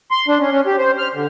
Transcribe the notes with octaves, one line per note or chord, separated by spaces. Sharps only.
C6
D4
C#4
C#4
G4
C5
F6
D3